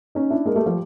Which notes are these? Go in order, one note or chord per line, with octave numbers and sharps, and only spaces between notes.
C#4 D#4
D4 E4
G#3 A#3
G3 A3
F3 G3